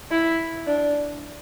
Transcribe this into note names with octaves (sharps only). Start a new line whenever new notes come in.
E4
D4